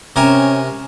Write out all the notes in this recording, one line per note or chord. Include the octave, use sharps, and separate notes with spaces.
C3 C#4 A#4 G#5